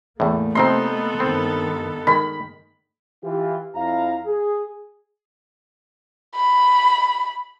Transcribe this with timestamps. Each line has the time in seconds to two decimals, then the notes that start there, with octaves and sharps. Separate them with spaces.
0.20 E2 A2 A3 A#3
0.55 C3 F3 B3 C4 D#4 A4 C6
1.20 G2 D#3 C4
2.07 D#3 G#3 B5
3.24 E3 F4 G4
3.76 F2 E4 F5 A#5
4.26 G#4
6.35 B5